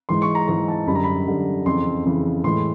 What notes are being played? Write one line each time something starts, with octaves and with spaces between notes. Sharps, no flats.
G#2 E3 G#3 C6
C#6
A#5
G#2 E3 G#3 A#5
A5
F#2 D3 G3 B5
A#5
B5
F#2 D3 G3
F2 C#3 E3 C6
F2 C#3 E3
A2 E3 G#3 C6